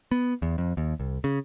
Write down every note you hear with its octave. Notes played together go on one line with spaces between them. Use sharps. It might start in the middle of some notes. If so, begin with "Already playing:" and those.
B3
E2
F2
D#2
C2
C#3